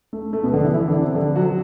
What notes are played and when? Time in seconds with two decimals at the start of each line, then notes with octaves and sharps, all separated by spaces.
0.13 A3
0.33 A3
0.43 B2 B3
0.54 D3 D4
0.64 E3 E4
0.74 E3 E4
0.88 D3 D4
1.02 C3 C4
1.15 D3 D4
1.36 F#3 F#4